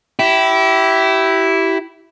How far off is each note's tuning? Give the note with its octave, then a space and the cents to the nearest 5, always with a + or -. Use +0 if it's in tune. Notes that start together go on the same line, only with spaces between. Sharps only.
E4 +0 G4 -30